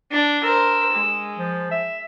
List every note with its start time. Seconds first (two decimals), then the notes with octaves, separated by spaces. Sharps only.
0.12 D4
0.44 A#4 C5 E6
0.94 G#3
1.38 F3
1.71 E5